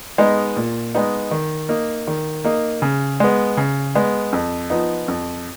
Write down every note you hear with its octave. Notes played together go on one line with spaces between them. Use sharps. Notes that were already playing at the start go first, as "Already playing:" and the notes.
G#3 B3 D#4
A#2
G#3 B3 D#4
D#3
A#3 D#4
D#3
A#3 D#4
C#3
G#3 B3
C#3
G#3 B3
F2
F3 B3 D#4
F2